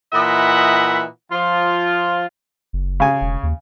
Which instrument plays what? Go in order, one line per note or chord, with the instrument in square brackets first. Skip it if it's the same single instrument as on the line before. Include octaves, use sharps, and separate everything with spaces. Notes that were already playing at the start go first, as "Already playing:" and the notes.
[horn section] A#2 E3 D#5 E5 F#5 B5
F3 F4
[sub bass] F#1
[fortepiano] C#3 G#5
[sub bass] E1
D#2